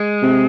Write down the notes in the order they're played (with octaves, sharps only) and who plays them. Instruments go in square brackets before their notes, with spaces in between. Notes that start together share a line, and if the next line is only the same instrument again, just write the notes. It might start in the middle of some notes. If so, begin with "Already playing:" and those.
Already playing: [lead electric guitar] G#3
[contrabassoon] C3